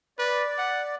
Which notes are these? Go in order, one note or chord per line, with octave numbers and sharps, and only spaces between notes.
B4 D5
F#5